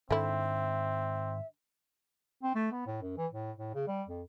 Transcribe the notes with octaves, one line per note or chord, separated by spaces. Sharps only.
G#2 D3 D#3 C4 E4 E5
C4
A3
B3
A2
F#2
E3
A2
A2
C#3
G3
F2